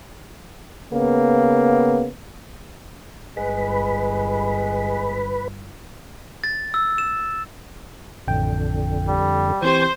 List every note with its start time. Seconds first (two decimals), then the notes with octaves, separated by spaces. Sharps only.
0.93 C#3 A#3 B3
3.37 G1 G#3 B4
6.44 A6
6.74 E6
6.98 E7
8.28 A1 F2 D3 G5
9.08 G3
9.62 E3 C4 G4 C5 G#5 C#6